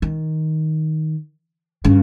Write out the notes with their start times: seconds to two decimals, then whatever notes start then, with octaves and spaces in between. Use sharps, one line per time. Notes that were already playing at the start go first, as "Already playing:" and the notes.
0.02 D#3
1.85 G2 C#3